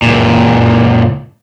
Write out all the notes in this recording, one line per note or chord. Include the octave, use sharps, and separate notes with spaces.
C#2 A#2